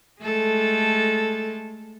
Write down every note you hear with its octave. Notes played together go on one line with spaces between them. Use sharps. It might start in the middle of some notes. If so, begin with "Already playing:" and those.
G#3 A3 A4